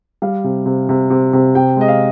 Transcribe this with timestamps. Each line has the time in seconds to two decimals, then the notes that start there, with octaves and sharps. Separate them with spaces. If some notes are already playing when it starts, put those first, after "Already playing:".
0.22 G3 F5
0.44 C3
0.66 C3
0.89 C3
1.10 C3
1.33 C3
1.55 C3 G5
1.76 G#3 D#5
1.88 F5